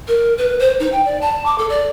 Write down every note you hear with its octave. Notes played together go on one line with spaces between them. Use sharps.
A#4
B4
C5
D#4
G5
D5
A5
D6
A4
D5